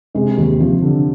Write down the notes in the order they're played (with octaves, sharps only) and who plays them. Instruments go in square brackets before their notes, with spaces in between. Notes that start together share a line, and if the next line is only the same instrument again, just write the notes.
[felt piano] C3 [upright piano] G#3
[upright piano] D#2
[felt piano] C3 [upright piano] F3
[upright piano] D3